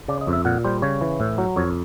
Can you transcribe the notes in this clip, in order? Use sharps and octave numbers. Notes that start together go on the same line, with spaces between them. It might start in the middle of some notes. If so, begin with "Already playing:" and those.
C#3 D5
D#5
F2
E5
A#2 F#5
G3 C5
C#3 C#5
E3
A2
F#3
F2 C#5